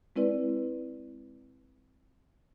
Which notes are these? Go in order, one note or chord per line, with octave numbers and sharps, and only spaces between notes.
G#3 C4 E4 B4 D5